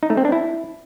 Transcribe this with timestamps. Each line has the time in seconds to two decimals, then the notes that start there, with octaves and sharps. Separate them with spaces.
0.03 D#4
0.10 A3
0.17 C4
0.25 D4
0.32 E4